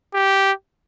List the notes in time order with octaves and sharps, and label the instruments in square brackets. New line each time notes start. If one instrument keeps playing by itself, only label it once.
[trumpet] G4